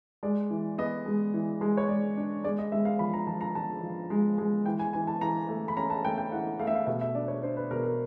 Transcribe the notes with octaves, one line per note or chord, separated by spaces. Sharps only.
G#3 D5
E3
B3 D#5
G#3
E3
G#3
C#5
G#3 D5
D4
G#3 D5
D#5
G#3 E5
F5
F3 B5
A#5
F3 A5
A#5
F3 A5
F3
G#3
G#3
E3 G5
G#5
E3 G#5
A5
E3 A#5
A3
B5
C#4 A#5
A5
A3 G5
G5
E3 F#5
A3 F5
E5
F5
B2 E5
E5
D4 D5
C#5
D4 C5
B4
B2 A#4
A#4